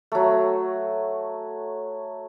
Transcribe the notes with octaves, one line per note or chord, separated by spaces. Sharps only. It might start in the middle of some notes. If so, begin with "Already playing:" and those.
F#3 A3